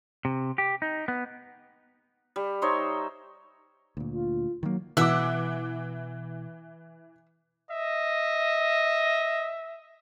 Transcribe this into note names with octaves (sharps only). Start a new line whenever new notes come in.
C3
G4
D#4
B3
G3
D#4 C5 C#5 E5
D2 A#2
F4
D#3 F#3 A#3
B2 E3 E5 F#5 D6
D#5 E5